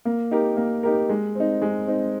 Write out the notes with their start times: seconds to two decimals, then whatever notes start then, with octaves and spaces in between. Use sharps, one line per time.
0.05 A#3
0.31 D#4 G4 A#4
0.57 A#3
0.83 D#4 G4 A#4
1.09 G#3
1.35 C4 D#4
1.62 G#3
1.87 C4 D#4